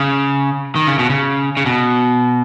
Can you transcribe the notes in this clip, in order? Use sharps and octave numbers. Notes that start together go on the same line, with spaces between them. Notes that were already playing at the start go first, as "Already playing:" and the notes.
Already playing: C#3
D#3
C#3
B2
C#3
C#3
B2